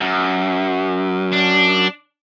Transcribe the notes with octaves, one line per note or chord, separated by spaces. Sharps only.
F#2
D4